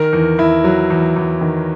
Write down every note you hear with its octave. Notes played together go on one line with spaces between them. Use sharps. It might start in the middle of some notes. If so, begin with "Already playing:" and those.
Already playing: D#3 A#4
E2
E2 E4
F#3
E2
E2
D#3